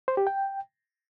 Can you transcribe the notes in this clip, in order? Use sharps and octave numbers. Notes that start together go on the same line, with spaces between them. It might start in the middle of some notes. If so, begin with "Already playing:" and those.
C5
G4
G5